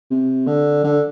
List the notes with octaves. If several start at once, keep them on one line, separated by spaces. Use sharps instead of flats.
C3
D3
D3